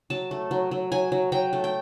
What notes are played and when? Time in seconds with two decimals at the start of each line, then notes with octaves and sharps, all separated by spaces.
0.10 F#3 A5
0.31 A3
0.51 F#3
0.71 F#3
0.92 F#3 G#5
1.12 F#3
1.32 F#3 G5
1.53 A3
1.64 G5